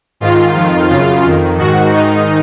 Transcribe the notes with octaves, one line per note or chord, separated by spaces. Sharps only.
G#2 D#3 F4
F2 D#3
F#2 C#3 F4
F2 D#3
G#2 D#3 F#4
G#2 D#3 D#4